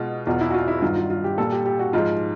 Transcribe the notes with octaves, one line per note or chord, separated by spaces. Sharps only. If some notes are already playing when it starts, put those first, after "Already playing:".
Already playing: B2 G#3 F4
E2 B2 F#3 F4
E4
F#4
F4
E4
G2 D#3 F#3 F4
F4
F4
G4
A#2 G3 A4
G4
G4
F#4
G#2 F3 G#3 F4